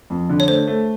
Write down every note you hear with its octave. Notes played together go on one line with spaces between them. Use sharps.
F2
D3
C#5
A3 C5
A3